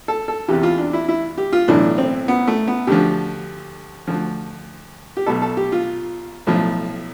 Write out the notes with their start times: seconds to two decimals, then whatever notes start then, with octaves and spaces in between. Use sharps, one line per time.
0.08 A4
0.28 A4
0.48 E2 C3 E3 G4
0.63 F4
0.78 D4
0.93 E4
1.08 E4
1.38 G4
1.53 F4
1.68 B1 A2 E3 D4
1.98 C4
2.28 B3
2.48 A3
2.68 B3
2.87 D2 D3 F3 G4
4.07 D2 D3 F3
5.17 G4
5.26 B1 B2 A4
5.42 A4
5.57 G4
5.72 F4
6.47 B1 A2 F3